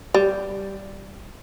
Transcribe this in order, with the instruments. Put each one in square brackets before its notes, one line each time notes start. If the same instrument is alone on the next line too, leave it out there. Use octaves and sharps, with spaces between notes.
[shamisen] G3